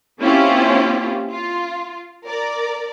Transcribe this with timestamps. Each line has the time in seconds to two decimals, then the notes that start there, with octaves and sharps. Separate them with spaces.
0.21 A#3 C4 C#4 E4 F4 G4
1.32 F4
2.27 A#4 D5